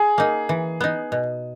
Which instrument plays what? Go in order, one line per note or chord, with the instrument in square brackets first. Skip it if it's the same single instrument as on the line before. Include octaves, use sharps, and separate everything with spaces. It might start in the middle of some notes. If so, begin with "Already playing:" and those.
Already playing: [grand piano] G#4
[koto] A#3 D#4
E3
B3 D#4
B2